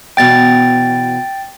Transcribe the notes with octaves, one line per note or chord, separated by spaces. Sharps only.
E2 B2 G5 A6